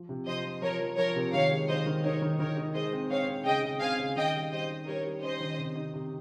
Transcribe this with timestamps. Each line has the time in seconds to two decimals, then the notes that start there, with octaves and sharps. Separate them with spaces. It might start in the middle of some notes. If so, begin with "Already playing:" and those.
Already playing: F3
0.09 C3
0.27 F3 C5 D#5
0.44 F3
0.62 F3 A#4 C#5
0.80 F3
0.97 F3 A#4 C#5
1.15 C3
1.33 D#3 C#5 F5
1.51 G#3
1.68 D#3 C5 D#5
1.86 D#3
2.04 D#4 A#4 C#5
2.22 D#3
2.39 D#3 A#4 C#5
2.57 D#4
2.74 G#3 C5 D#5
2.93 C4
3.10 C4 C#5 F5
3.28 C4
3.45 C#3 D#5 G5
3.63 C#3
3.81 C4 F5 G#5
3.99 C#3
4.16 D#3 D#5 G5
4.35 G3
4.52 G3 C5 D#5
4.70 G3
4.87 G3 A#4 C#5
5.06 G3
5.22 C#4 C5 D#5
5.40 D#3
5.59 C3
5.75 D#4
5.94 C3